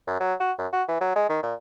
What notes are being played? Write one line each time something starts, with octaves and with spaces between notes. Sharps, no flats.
F#2
F#3
F#4
F#2
F#4
E3
F#3
G#3
D#3
A#2